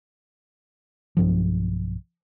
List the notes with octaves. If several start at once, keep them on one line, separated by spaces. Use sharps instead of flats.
B1 G2 F3